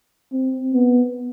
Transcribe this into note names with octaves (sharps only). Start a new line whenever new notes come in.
C4
B3